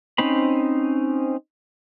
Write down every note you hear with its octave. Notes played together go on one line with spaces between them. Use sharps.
C4 C#4 D#4 C5 B5